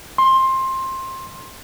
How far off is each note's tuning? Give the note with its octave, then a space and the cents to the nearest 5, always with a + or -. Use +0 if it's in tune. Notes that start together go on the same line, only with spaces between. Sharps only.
C6 +15